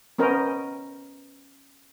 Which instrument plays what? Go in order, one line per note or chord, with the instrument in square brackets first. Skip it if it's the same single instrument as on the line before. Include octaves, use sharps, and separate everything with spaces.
[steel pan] B3 C#4 A#4 C5 D#5